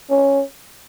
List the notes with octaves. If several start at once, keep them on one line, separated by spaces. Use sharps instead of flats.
C#4